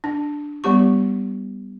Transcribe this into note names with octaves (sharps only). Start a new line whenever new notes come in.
D4
G3 B3 G4 C#6